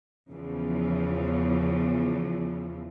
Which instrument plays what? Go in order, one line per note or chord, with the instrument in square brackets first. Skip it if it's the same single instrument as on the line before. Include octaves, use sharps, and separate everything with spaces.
[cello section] E2 C#3 E3 F3